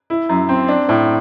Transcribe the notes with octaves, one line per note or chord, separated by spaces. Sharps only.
E4
F#2
C4
D4
A2